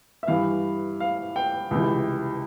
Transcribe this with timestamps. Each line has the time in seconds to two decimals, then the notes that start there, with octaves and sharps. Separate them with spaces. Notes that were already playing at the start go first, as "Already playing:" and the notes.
0.23 E5
0.28 G2 E3 F5
1.00 F5
1.36 G5
1.71 C#2 C3 E3